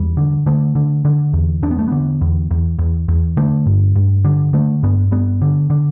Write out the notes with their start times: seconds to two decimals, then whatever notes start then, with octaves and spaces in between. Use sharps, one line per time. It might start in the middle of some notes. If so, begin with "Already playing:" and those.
Already playing: E2 G3
0.17 D3
0.46 D3 A3
0.75 D3
1.05 D3
1.33 E2
1.63 E2 D4
1.71 B3
1.79 A3
1.88 D3 B3
2.21 E2
2.51 E2
2.79 E2
3.08 E2
3.37 D3 A3
3.66 G2
3.96 G2
4.24 D3
4.53 D3 A3
4.83 G2 B3
5.11 G2 B3
5.42 D3
5.70 D3